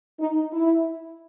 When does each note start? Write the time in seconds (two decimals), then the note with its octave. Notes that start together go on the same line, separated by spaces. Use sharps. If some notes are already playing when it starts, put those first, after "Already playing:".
0.20 D#4
0.52 E4